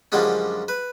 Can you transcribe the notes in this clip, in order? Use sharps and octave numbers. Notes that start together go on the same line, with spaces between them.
F#2 D3 F3 G3 G#3 C#4
B4